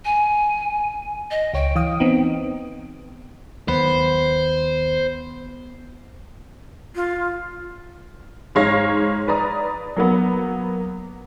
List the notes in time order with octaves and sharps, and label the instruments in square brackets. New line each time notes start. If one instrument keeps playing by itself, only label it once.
[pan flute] G#5
D#5
[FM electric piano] C#2 C#5 [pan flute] G5
[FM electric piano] E3 F5 D#6
B3 C4 D#4
[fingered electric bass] D#2 [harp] B3 [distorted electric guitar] C5
[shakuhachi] F4
[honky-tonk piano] G#2 G#3 C#5 F5 A#6
B4 D5 A#5 D#6
F#3 A#3 B3